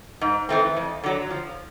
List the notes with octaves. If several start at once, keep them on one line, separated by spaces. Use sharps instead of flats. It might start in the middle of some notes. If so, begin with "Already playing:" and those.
G#2
E3 A3 C4
F2
D3 F#3
F3